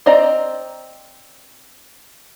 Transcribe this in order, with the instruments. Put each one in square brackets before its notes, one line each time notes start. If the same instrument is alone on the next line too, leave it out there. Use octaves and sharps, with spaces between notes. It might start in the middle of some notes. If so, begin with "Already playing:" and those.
[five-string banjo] C4 C5 D5 D#5 A#5